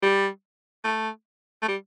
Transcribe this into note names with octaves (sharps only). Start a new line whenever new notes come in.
G3
A3
A3
G3